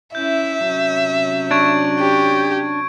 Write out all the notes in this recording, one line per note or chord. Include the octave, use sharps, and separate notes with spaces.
C#4 E4 E5 G6
C3 F#3 C#4
D4 C#6 G#6 D7
G4